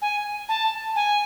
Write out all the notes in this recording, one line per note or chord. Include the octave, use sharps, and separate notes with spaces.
G#5
A5
G#5